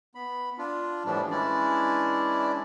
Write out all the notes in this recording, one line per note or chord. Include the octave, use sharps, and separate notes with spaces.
B3 B5
D4 F4
A2 E3 F3 G3 D4
E3 G#3 C#4 D4 E4 D5